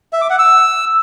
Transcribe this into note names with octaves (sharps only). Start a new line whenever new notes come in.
E5
D6
F#5
E6